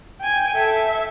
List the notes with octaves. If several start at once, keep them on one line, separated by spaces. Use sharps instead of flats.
G5 G#5
A4 E5